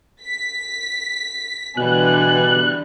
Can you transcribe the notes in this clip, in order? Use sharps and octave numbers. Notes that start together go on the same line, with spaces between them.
B6
B2 D3 E3 G3 B3 G#5 F#6